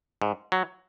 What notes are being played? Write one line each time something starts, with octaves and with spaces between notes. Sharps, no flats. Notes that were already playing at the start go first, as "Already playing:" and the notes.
G#2
F#3